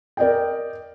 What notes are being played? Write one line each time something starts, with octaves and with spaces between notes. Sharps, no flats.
A#4 D5 D#5 G5